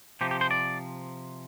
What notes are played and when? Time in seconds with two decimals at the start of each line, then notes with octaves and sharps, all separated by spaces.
0.21 C3 F3 G4
0.31 G4
0.41 C5
0.51 D5